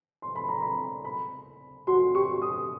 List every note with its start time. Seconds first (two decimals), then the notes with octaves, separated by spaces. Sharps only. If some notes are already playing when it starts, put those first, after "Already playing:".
0.22 C6
0.36 B5
0.49 A#5
0.62 B5
1.05 B5
1.87 F#4 C6
2.15 G4 C#6
2.42 D#6